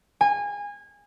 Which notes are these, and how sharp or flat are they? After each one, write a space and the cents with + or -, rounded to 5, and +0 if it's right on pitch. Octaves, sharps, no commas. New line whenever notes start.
G#5 -25